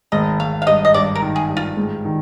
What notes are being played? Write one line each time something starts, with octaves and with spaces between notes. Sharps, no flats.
G#1 D#5
G#1 F5
F5
G2 D#5
D#5
G2 D5
A#4
D#3
G#4
G2
F4
G#2
D#3